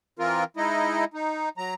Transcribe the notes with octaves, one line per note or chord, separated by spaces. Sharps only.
E3 C4 F4 A#4
G#3 D#4 E4 D#5
D#4
F#3 A#5